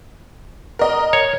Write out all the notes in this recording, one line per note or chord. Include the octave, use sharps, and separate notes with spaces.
A#4 D#5
C#5